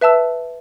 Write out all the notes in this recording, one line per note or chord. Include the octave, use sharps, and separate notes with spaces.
B4 E5 A5 E6